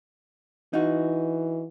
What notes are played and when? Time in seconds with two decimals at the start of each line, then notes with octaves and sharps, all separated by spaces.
0.73 E3 D#4 F#4